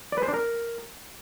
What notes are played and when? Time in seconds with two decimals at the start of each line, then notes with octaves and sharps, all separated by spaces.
0.12 D5
0.18 B4
0.23 C5
0.28 D4
0.34 A#4